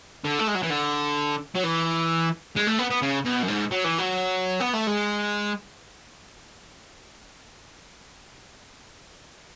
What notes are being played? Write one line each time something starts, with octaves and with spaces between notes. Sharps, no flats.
D3
A3
G#3
F#3
E3
D3
F#3
E3
G#3
A3
B3
B3
C#3
B2
F#2
G#2
F#3
E3
F#3
B3
A3
G#3